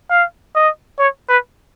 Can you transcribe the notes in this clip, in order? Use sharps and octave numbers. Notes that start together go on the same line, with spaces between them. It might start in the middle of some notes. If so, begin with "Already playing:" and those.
F5
D#5
C#5
B4